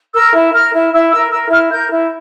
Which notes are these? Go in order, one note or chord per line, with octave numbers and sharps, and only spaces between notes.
A#4 E6
E4
A#4 F6
E4
E4 E6
A#4 E6
A#4 E6
E4 F6
A#4 G6
E4